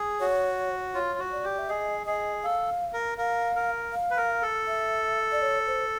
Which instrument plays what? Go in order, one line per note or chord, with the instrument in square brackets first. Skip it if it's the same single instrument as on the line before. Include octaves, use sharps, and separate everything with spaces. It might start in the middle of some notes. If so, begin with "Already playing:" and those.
Already playing: [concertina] G#4
[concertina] F#4 [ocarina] C#5
[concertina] F4 [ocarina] C#5
[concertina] F#4
[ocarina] D5
[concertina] G4
[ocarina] E5
[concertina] G#4 [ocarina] D#5
[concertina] G#4 [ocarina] D#5
[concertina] A4 [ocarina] F5
[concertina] A#4
[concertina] A#4 [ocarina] F5
[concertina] A#4
[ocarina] F5
[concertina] B4
A#4
A4
[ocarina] E5
D5
C#5
C5